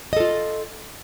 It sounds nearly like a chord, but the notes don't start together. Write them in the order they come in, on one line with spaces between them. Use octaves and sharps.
D#5 A4 F4